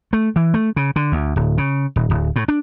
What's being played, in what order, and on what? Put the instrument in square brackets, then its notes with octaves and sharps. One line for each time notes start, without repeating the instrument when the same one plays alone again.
[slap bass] A3
E3
A3
C#3
D3
D2
D1
C#3
D#1
D1
A2
D4